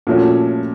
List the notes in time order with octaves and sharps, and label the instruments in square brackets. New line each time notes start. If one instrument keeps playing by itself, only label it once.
[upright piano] A#2 F3 A3 C#4 F#4